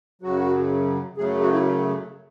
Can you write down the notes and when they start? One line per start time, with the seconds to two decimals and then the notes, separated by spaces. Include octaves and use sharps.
0.22 F#2 C#3 F#3 F#4
1.17 F#2 C#3 F#3 A3 G#4
1.41 F#4
1.53 E4